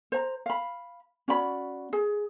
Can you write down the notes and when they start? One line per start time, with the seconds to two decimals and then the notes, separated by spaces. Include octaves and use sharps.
0.12 C5 A#5
0.46 F5 B5
1.28 C#4 F#4 D5 B5
1.93 G#4